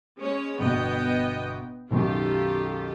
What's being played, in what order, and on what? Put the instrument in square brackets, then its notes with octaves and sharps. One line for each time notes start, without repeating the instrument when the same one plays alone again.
[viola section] G#3 C#4 C#5
[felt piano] G1 B2 [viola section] B3 D#5 G5
[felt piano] B1 F#2 D#3 [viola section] F4 G4 A4